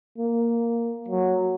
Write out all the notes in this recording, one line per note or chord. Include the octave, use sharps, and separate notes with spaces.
A#3
F#3